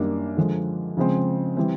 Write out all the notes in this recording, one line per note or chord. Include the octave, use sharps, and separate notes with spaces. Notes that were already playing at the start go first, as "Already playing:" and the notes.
Already playing: F#2 D#3 G3 A#3 D4
D3 F3 G#3
C#3 F3 G#3 C4
E3 G3 C4